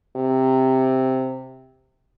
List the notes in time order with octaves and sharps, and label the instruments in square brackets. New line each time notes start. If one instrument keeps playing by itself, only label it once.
[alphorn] C3